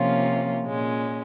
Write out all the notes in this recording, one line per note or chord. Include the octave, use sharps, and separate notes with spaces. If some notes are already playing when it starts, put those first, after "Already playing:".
Already playing: C3 F3 A#3 C#4 F4
A#2 G#3 C#4